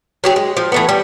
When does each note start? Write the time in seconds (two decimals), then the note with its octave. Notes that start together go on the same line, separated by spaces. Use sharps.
0.24 F#3 G4 G#4
0.36 G#3
0.57 F3
0.72 E3 A3 B3
0.89 G3